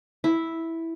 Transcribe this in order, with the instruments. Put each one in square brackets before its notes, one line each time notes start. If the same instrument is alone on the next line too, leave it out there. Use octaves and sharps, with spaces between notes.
[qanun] E4